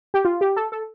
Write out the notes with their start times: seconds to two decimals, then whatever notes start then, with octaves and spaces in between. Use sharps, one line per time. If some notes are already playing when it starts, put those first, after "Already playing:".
0.14 G4
0.25 F4
0.41 G4
0.56 A4
0.72 A4